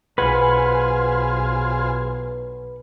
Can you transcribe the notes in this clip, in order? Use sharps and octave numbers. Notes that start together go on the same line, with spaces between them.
B1 F4 G#4 B4 C5 F#5 G#5